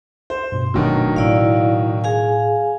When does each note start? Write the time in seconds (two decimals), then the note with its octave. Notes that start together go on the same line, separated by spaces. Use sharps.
0.30 C5
0.52 G2 B2
0.74 G1 B2 D#3 F#3 A3 D4
1.16 A2 E4 D5 F5
2.04 G#4 F5 G#5